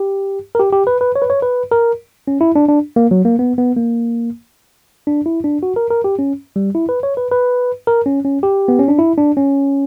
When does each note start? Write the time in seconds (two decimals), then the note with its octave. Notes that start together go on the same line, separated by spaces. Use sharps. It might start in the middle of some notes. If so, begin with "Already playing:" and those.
Already playing: G4
0.55 A#4
0.60 G4
0.73 G4
0.87 B4
1.01 B4
1.16 C#5
1.22 B4
1.30 C#5
1.42 B4
1.72 A#4
2.28 C#4
2.41 E4
2.56 D4
2.68 D4
2.96 A#3
3.11 F#3
3.25 A#3
3.39 B3
3.58 B3
3.77 A#3
5.07 D4
5.26 E4
5.44 D4
5.63 F#4
5.76 A#4
5.90 A#4
6.04 G4
6.19 C#4
6.56 G3
6.75 E4
6.89 B4
7.03 C#5
7.17 B4
7.31 B4
7.87 A#4
8.06 C#4
8.25 C#4
8.43 G4
8.68 B3
8.79 C#4
8.88 D4
8.99 E4
9.18 D4
9.37 C#4